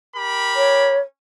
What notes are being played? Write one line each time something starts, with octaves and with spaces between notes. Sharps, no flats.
G4 A#4 B5
C#5